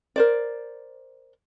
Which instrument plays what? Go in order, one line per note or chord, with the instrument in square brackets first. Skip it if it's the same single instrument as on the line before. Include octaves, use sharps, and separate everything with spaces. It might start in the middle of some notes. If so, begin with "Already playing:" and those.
[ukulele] A#4 C5 D5